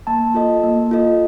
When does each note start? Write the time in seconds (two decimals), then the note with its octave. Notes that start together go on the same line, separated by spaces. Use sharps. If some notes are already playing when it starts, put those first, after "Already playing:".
0.07 A#3 A5
0.34 F4 A4 D#5
0.63 A#3
0.91 F4 A4 D#5